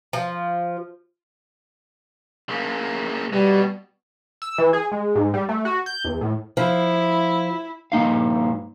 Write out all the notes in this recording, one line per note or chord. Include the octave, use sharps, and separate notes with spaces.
F3
C#3 A#3
B2 G3
E6
E3
G#4
G#3
G#2
G3
A3
F#4
G6
E2
A2
F3 E4
G2 A#3 D#4 F5